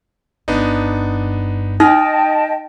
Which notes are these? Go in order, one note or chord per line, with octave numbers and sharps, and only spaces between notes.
G1 G2 B3 D4 D#4
D#4 D#5 G5 A5 D#6 F6 A#6